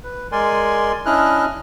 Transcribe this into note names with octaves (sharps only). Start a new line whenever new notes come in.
B4
G#3 A#4 D5 G#5 C6
C#4 D4 E4 D#5 F6 F#6